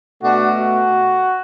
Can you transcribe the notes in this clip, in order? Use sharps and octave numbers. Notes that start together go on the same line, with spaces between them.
B2 A3 D4 F#4
F#4